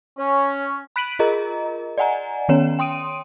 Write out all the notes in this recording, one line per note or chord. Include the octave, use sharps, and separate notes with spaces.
C#4
B5 F#6 B6 D7 D#7 F#7
F4 G#4 A#4 D#5 A#5
D5 D#5 F#5 G#5 A#5
D#3 B3 C#4 C#5 E7
G5 C6 D#6 D7 D#7